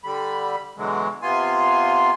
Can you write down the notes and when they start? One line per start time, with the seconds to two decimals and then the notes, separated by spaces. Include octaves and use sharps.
0.04 D3 G3 B5
0.77 B2 D3 E3 F#3 G#3
1.22 C3 B3 F4 G#5 C6